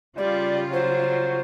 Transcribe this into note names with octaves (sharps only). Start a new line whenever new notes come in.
C#3 G3 F4 D5
F#3 C5